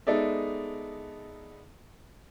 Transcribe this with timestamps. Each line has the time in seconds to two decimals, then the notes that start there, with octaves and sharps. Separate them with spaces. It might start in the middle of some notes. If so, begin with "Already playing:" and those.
0.07 G#3 B3 D#4 A4 D5 E5